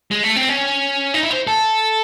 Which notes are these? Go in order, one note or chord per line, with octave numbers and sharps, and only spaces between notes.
G#3
A3
C4
C#4
D#4
E4
C5
A4